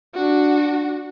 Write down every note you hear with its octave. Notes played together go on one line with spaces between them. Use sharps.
D4 F#4